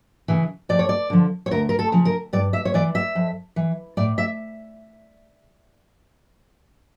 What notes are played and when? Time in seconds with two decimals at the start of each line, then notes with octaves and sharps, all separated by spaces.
0.28 C#3 E3
0.69 F2 D5
0.79 C#5
0.89 D5
1.10 D3 F3
1.46 C#5
1.51 D2 A#4
1.69 A#4
1.79 A4
1.92 C#3 F3
2.05 A#4
2.33 G2 D5
2.53 E5
2.65 C#5
2.74 E3 D5
2.95 E5
3.15 F2
3.56 E3
3.97 A2 D5
4.18 E5